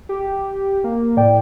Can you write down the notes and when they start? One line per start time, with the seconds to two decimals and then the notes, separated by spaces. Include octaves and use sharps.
0.09 G4
0.84 A#3
1.17 A2 D5 G5